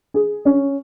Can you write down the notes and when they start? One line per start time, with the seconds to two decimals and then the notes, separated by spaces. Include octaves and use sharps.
0.14 G#4
0.45 C#4